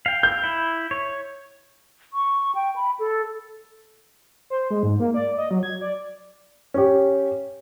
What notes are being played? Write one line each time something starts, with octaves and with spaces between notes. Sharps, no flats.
F5 G5
G6
E4
C#5
C#6
G5
B5
A4
C5
G#3
G#2
A#3
D5
D#5
F#3
G#6
D5
C#4 G4